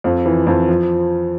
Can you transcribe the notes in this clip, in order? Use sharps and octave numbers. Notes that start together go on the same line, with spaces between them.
F2
E3
F2
F3